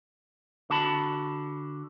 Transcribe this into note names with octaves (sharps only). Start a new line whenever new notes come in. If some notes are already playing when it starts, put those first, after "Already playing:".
D3 F#4 A5 B5